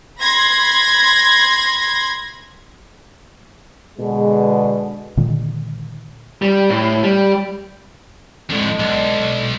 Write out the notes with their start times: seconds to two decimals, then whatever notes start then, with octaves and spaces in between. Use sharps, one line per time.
0.20 B5 C6 G#6 A#6
3.99 B2 D3 G#3
5.17 A#2 D3 D#3 G#3
6.42 G3
6.70 A2
7.03 G3
8.50 F2 A2 D3 G#3
8.79 B1